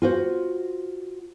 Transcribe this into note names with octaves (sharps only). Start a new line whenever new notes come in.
F4 F#4 C5